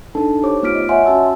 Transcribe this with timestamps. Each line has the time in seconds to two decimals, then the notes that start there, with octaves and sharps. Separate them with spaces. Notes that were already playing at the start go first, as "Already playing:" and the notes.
0.15 D4 D#4 A4 A5
0.43 D#4 G4 C5 C#5 D6
0.63 A3 B3 F4 F6 B6 D7
0.75 D#5
0.89 C#5 D#5 E5 F#5 G#5 C6
1.06 C#4 F#4 A5 E6